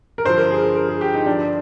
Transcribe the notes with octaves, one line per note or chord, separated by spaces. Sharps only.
A#4
G2 D3 F3 C5
A#4
G#4
A#4
A#4
G#4
G4
D#4
G2 D3 F3 D4